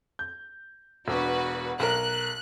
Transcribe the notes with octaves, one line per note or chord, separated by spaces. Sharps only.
G6
E1 D4 F#4 B4
B1 A#4 F#6